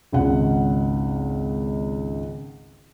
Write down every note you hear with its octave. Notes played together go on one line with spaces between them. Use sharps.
G#1 C#2 F#5